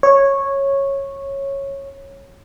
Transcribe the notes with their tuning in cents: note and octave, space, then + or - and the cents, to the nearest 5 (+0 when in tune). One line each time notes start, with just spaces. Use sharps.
C#5 -10